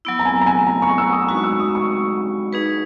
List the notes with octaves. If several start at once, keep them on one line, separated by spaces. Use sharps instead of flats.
F#3 B3 E4
A#5
G#5
A#5
G#5
A#5
C#6
E6
D#6
G#3 D#4 F#4 C#6
E6
D#6
C#6
D#4 G#4 B4